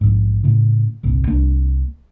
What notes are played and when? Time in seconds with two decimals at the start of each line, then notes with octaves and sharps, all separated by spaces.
0.01 A#1 G#2
0.43 A2 C#3
1.03 G1 C2 A#2
1.27 C2 A3 A#3 D4